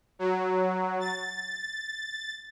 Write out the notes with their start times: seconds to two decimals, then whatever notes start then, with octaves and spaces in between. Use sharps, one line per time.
0.19 F#3
1.00 A6